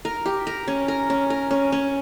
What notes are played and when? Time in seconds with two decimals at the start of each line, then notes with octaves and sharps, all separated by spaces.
0.05 A#4
0.26 G4
0.47 A#4
0.68 C#4
0.88 A#4
1.10 C#4
1.30 A#4
1.51 C#4
1.72 C#4